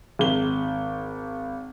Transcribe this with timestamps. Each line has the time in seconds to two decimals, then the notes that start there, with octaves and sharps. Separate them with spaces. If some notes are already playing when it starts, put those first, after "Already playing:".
0.19 G#1 G7